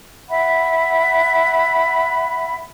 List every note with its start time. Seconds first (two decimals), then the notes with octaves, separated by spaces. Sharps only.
0.29 E5 F#5 B5